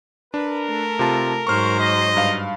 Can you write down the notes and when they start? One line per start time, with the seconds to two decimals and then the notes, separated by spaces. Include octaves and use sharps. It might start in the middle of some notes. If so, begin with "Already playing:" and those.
0.34 D4 A#4 B4
0.66 A3 A4
0.99 C3 F4 A5
1.47 G#2 F#3 C5 C#6 F6
1.80 D#5
2.17 G2 F5